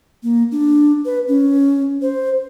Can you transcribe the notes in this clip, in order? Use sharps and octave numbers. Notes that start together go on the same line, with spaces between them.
A#3
D4
B4
C#4
C5